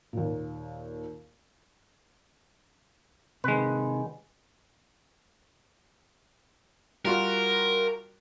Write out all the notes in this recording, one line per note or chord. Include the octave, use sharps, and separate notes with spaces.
D#2 A#2
C3 D#3 G#3 B4
G3 F4 F#4 A#4